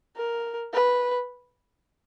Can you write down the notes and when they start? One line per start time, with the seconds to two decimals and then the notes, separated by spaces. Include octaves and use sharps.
0.17 A#4
0.74 B4